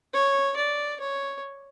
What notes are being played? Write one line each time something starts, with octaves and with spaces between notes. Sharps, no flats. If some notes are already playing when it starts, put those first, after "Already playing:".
C#5
D5
C#5